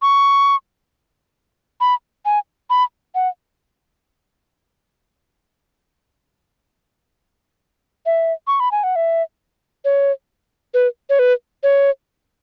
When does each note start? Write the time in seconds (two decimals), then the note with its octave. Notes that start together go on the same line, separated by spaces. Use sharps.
0.02 C#6
1.81 B5
2.25 G#5
2.70 B5
3.15 F#5
8.06 E5
8.47 C#6
8.60 B5
8.72 G#5
8.84 F#5
8.96 E5
9.85 C#5
10.74 B4
11.10 C#5
11.19 B4
11.63 C#5